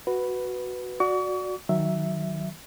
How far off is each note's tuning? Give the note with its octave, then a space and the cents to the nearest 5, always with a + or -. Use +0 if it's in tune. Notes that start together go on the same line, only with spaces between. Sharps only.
F#4 +0 B4 +0
F#4 -10 D5 +0 C#6 +40
D#3 +0 F#3 +0 E5 +0